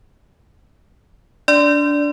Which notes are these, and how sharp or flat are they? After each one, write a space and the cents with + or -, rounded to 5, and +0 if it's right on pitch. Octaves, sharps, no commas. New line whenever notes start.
D4 -20 D5 +0 C6 -25